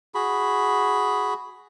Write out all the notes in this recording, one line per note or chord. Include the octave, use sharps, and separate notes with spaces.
F#4 G#4 B5